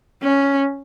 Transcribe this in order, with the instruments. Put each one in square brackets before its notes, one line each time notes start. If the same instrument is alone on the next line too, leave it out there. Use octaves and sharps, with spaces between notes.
[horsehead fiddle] C#4